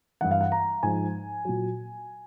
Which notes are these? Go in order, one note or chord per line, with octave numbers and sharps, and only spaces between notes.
G2 E3 F#5
F5
F#5
A#5
G#2 F3 G#5
A#2 F#3